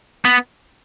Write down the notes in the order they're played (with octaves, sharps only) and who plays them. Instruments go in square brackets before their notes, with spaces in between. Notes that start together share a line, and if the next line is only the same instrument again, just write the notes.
[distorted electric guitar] B3